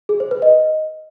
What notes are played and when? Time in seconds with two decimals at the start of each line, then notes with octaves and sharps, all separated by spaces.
0.09 G#4
0.20 C5
0.31 B4
0.42 D#5